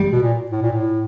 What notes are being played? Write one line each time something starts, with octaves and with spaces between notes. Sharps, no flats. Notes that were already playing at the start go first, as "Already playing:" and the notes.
Already playing: G3
B2
A#2
A2
A#2
A2